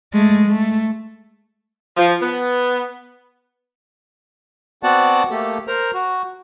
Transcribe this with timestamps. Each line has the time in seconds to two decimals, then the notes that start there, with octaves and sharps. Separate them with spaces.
0.13 G#3 A3
0.47 A3
1.97 F3
2.21 B3
4.83 B3 C4 F#4 D5 F#5 A5
5.31 A3 A#3 G4 A4
5.67 A#4 C5 A#5
5.94 F#4